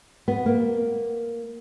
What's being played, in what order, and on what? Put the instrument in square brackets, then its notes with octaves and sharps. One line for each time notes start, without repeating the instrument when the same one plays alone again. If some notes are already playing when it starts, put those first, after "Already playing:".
[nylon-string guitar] B3
A#3